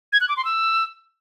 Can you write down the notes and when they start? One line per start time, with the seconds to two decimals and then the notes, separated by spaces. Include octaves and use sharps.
0.12 G#6
0.21 F#6
0.29 D6
0.37 C6
0.45 E6